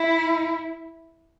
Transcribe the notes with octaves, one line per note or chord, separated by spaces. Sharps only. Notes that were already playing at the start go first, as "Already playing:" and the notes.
Already playing: E4